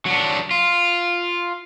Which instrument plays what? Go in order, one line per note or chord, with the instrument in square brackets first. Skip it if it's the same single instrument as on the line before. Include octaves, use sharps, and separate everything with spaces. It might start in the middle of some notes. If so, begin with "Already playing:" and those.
[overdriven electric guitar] F#3 D4
F4